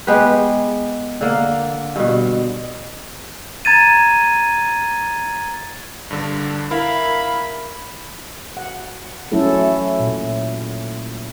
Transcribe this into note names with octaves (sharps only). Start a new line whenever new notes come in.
G#3 B3 G4 B4
D3 A#3
G2 B2
A#5 G#6 A6 D#7
G2 D3
E4 A#4 F5 B5
F#5
F#3 A3 C#4 E4 A4
A#2